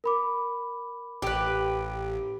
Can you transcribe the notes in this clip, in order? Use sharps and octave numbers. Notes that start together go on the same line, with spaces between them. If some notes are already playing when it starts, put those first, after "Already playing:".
A#4 B5 D6
A1 G4 B4